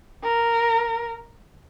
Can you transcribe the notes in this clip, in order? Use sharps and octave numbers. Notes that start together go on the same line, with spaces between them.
A#4